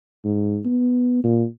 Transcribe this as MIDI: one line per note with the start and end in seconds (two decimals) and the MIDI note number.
0.25 0.60 44
0.65 1.20 59
1.24 1.45 46